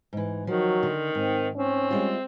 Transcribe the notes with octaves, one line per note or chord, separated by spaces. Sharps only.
G#2 E3
D#3 F3 F#3
D3
G#2 C4
C4 C#4
G3 G#3 F4